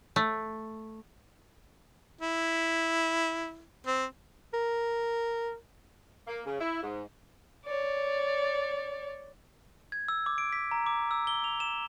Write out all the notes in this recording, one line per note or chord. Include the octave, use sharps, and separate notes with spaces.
A3
E4
C4
A#4
A#3
C#3
E4
G#2
C#5 D5
G#6
E6
D6
D7
B6
A#5
D6
E6
G7
F7
E7